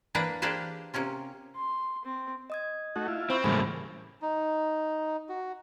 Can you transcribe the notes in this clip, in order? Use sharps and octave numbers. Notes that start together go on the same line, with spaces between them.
E3 A#3 D4 B4 A#5
A#3 D4 G4 G#4 B4 C5
C3 A#3 C#4 F4
C6
C4
D#5 D#6 G#6
A3 D#4 F#4
E4 F4
C4 C5 B5 C#6
A2 C#3 E3 G3 G#3 A#3 B5 F6
D#4
F#4